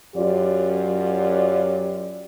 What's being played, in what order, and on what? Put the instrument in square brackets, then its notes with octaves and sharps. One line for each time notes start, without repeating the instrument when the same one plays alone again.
[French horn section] F#2 F#3 F4 G4 D5